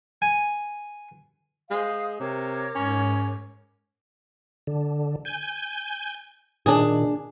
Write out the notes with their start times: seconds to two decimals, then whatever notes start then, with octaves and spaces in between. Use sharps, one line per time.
0.22 G#5
1.71 G#3 C5 F5 D#6
2.20 C3 A#4 C#5 D6
2.75 G#2 C#4
4.67 D3
5.25 G#5 G6
6.66 A#2 D#3 D4 G#4